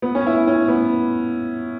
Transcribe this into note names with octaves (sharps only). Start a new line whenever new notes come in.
B3
C#4
E4
C#4
B3